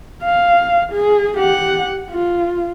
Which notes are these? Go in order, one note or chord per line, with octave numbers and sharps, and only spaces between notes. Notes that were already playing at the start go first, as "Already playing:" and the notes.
F5
G#4
G4 F#5
F4